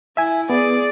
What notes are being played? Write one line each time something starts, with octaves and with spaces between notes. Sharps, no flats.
E4 E5 G#5
B3 G#4 D5